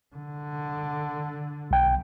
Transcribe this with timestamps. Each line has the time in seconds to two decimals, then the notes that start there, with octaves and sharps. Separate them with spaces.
0.15 D3
1.71 B1 G5